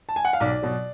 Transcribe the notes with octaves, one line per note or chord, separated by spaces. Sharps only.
A5
G#5
F#5
F5
B1 D5
B2 F#3